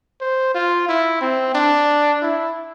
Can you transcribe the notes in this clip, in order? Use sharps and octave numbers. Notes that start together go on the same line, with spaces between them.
C5
F4
E4
C4
D4
E4